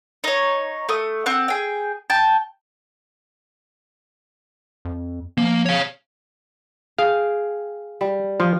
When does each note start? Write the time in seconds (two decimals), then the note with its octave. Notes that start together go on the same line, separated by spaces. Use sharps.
0.24 D#4 C#5
0.89 A3 D#6
1.26 C4 F#5
1.48 G#4 G5
2.10 G5 A5
4.85 F2
5.38 F3 A#3
5.66 C#5 F5
6.98 G#4 F5 G5
8.01 G3
8.40 F3 F4